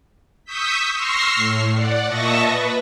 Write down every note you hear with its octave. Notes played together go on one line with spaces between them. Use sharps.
C#6 D#6 E6 G6 B6
C6 C#6 E6 F6 A#6 C7
A2
D5 F#5
A#2 D#5 E5 A5 C#6 A#6
B4